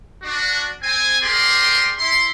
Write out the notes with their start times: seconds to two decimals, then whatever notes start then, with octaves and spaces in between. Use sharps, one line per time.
0.22 D4 F#4
0.82 C4 G#5
1.22 G4 G#4 A#4 D5 C6
1.97 E4 C6